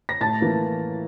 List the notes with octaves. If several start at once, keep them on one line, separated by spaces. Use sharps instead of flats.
A#6
A2 A5 A6
E3 A#3